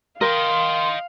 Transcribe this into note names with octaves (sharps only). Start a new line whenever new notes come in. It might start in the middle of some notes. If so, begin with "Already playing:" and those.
A#4 D#5 F5 G5 C6